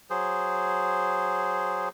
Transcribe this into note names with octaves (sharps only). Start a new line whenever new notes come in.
F#3 G#4 C5